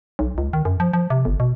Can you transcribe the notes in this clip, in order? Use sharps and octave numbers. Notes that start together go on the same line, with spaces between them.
B1
C#2
D#3
F#2
F3
F3
C3
G1
B2